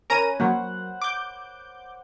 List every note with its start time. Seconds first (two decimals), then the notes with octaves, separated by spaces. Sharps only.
0.10 C#4 A#4 B4 A#5 D#7
0.40 F#3 A#3 C5 F#5
1.02 D6 G6